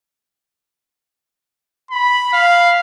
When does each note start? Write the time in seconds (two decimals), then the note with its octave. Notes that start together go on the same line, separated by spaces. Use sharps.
1.91 B5
2.33 F5